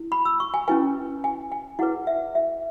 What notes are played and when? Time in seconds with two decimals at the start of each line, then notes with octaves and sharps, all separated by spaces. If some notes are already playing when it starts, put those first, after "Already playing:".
Already playing: E4
0.12 B5
0.25 E6
0.40 C#6
0.54 G#5
0.68 C#4 E4 B4 G#5
1.24 G#5
1.52 G#5
1.79 E4 G#4 B4 F#5
2.07 E5
2.35 E5